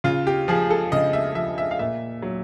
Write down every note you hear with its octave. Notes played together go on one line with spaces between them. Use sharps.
C#3 F4
G4
F3 G#4
A4
C#3 D#5
E5
F3 E5
E5
F5
A#2 E5
F#3